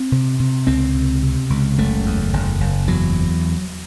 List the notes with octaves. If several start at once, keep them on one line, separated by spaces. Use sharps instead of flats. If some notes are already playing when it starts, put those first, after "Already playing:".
Already playing: C4
C3
C3
C#2 C4
C3
C3
C#2
F#1 A3
E2
F#1
F#1
E2 F#3